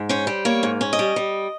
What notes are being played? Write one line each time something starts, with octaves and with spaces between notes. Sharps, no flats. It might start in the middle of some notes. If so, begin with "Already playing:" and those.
Already playing: G#2
C#4 C5
G3
A#3 C#5
G#2
C#4
D#5
G3
G3